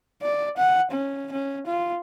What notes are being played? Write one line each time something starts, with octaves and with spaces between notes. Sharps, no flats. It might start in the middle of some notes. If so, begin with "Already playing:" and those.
D5
F#5
C#4
C#4
F4